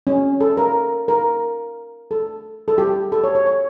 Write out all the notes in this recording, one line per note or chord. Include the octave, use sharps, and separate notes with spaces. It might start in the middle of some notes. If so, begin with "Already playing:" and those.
C#4
A4
A#4
A#4
A4
A4
G4
A4
C#5
C#5
C#5